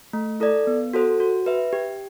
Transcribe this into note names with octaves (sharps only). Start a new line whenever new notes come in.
A3
E4 A4 D5
B3
F#4 A4 C5
F#4
B4 E5
G4